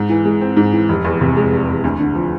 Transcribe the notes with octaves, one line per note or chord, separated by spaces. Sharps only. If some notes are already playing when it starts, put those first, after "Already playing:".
Already playing: G#2
E3
G#3
C4
G#2
E3
F1
E2
C3
G#3
F1
E2
D2
D3
F3